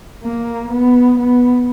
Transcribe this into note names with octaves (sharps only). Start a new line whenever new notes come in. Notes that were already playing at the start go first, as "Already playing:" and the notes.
A#3
B3
B3